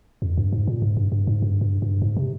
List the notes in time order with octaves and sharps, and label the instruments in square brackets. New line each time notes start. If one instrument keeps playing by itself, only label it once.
[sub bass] F2
G2
G#2
A#2
G#2
G2
G2
G#2
G2
G2
G2
G#2
C3